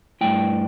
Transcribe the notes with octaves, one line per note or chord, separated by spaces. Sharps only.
G2 D3 A3 E4 G5